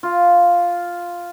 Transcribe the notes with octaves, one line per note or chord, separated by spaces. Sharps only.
F4